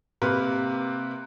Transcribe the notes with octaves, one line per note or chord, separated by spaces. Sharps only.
C3 A#3 A#4 B4